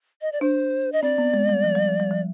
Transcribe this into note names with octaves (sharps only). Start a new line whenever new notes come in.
D#5
D5
D4 C5
D#5
C4 D5
B3
G#3
G3
F3
G3
F3
G3
F3